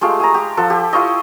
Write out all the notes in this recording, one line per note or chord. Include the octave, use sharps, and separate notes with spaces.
G#3 A3 F4 G4
G#4 A#5
G4
F3 A4 F#5
G4
E4 F4 C#5 D#5